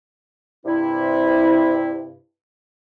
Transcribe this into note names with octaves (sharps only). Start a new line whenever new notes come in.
G2 C3 E4